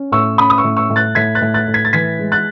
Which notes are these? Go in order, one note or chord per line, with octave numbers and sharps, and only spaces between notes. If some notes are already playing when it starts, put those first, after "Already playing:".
Already playing: C#4
A2 C#6 E6
C#4 B5 D#6
D#6
C#6 E6
A2
C#6 E6
A2
F#6 A6
A2 G#6 B6
F#6 A6
A2
F#6 A6
A2
G#6 B6
A6
E3 G#6 B6
G#3
F#6 A6